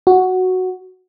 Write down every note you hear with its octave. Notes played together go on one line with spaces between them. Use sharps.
F#4